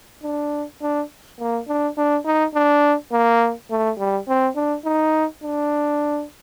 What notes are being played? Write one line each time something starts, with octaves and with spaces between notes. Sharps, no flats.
D4
D4
A#3
D4
D4
D#4
D4
A#3
A3
G3
C4
D4
D#4
D4